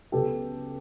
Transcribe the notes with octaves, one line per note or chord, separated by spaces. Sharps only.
C#2 C#3 F#3 B3 G4 A4